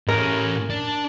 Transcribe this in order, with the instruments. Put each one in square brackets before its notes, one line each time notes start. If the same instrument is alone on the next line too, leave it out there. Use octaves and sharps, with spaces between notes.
[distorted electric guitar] A2 C#4 [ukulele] A#4
[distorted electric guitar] D4